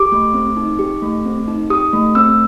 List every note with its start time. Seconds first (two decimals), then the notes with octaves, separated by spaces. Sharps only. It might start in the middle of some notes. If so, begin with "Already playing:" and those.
Already playing: G4 D6
0.12 A3
0.34 C4
0.57 D#4
0.79 G4
1.02 A3
1.25 C4
1.48 D#4
1.70 G4 D#6
1.93 A3
2.15 C4 E6